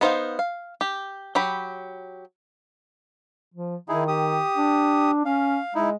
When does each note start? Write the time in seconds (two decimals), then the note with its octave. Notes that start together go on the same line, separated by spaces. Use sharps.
0.01 B3 D#4 C5 E5 F5
0.39 F5
0.81 G4
1.35 F#3 G4 G5 B5
3.54 F3
3.89 D#3 D#4 E4 G#4
4.08 G4 D#6
4.56 D4
5.25 C#4 F5
5.75 G#3 D#4 E4